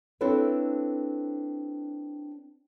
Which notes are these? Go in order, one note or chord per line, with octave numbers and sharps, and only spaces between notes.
C4 D4 E4 A4 B4 C#5